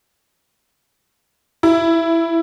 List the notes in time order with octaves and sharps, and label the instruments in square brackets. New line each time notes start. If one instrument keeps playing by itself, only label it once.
[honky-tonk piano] E4